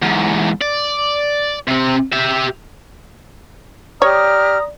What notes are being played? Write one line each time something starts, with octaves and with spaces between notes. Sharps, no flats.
E2 G#2
D5
C3 C4
G4 E5
G4 C#5 D5 A#5 D#6 F6